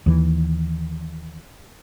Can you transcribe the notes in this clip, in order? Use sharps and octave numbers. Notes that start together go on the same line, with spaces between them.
D#2 E3